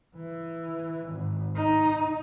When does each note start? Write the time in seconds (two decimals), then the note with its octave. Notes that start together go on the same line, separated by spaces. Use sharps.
0.16 E3
1.09 G#1
1.55 D#4